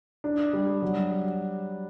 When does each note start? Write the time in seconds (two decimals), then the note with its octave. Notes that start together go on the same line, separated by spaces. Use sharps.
0.24 D4
0.53 G3
0.82 F#3